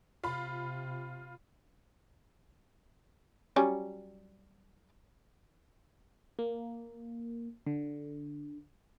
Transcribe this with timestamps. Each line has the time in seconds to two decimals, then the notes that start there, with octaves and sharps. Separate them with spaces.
0.24 C3 F4 B5
3.56 F#3 G3 C#4
6.39 A#3
7.67 D3